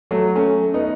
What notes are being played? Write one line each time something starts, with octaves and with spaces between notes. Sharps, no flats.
F#3 A3
A3 C#4
B3 D#4